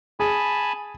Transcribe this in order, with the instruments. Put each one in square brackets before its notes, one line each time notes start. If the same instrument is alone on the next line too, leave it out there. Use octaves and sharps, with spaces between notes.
[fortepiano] G#4 [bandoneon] G#5 A5 B5